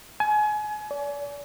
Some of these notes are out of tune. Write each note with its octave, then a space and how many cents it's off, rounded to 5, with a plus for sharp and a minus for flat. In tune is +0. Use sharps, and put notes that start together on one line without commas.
G#5 +30
D5 -40